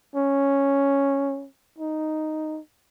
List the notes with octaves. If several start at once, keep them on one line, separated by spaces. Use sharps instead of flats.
C#4
D#4